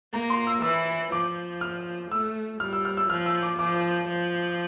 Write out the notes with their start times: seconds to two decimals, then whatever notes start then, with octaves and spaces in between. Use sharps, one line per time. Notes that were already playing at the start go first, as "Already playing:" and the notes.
0.13 A#3 A#5
0.30 C6
0.47 E6
0.62 E3 E6
1.12 F3 D6
1.61 F6
2.11 A3 E6
2.60 G3 F6
2.73 E6
2.85 F6
2.97 E6
3.10 F3 F6
3.26 E6
3.43 D6
3.59 F3 D6
4.08 F3